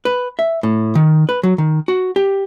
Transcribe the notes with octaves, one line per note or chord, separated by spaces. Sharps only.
B4
E5
A2
D#3
B4
F#3
D#3
F#4
G4